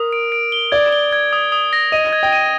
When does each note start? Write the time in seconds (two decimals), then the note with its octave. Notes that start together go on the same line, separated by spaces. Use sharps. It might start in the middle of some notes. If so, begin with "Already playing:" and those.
Already playing: A#4 D#6
0.13 D7
0.32 D7
0.52 G7
0.72 D5 G#6
0.92 G7
1.13 G#6
1.33 D#6
1.52 D#6
1.73 A#6
1.92 D#5 D#7
2.13 G#6
2.23 G5
2.32 D#7